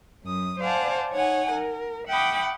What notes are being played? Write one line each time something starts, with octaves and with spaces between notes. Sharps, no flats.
F#2 D#6
C5 D5 F5 F#5 G#5 A5
D#4 C#5 F#5 G#5
A#4
E5 F#5 G5 B5 D6 D#6